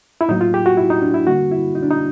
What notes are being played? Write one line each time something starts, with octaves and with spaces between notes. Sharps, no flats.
E4
A2 F#3 A#3 D#4
F4
G4
F#4
E4
D#4
D4
E4
D3 G3 A#3 F#4
E4
D#4
D4
D#4